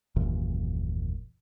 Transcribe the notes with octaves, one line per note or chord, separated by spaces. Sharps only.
F#1 D#2 A#2 E3